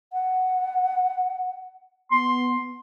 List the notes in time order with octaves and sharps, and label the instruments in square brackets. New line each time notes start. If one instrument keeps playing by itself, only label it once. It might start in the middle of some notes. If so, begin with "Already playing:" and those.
[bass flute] F#5
[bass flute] B3 [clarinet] C6